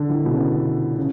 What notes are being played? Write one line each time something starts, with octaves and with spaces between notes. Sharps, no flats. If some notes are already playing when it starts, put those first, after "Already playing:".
Already playing: D3
E3
B2
C#3
C#3